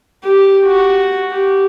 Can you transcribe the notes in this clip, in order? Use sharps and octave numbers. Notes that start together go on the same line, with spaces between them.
G4
F#4
G4